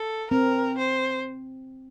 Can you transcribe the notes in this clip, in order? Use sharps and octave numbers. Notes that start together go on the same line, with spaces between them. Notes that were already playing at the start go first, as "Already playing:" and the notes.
Already playing: A4
C4 A#4
C5